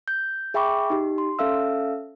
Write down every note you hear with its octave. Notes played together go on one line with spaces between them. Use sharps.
G6
G#4 E5 G5 B5 C#6 D6
D#4 G4
C6
C#4 A4 E5 F5 E6